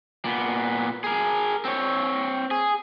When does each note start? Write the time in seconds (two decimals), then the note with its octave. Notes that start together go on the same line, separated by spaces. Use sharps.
0.25 A#2 B3
1.04 G#4 A#4
1.65 C4 C#5
2.51 G#4